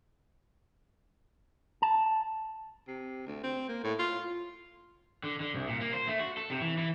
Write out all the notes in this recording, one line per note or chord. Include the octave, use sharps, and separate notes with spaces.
A5
C3
D2
C4
A#3
A2
F4
D3
D3
C2
A#2
A#3
C5
A3
F#4
A4
C3
E3
E3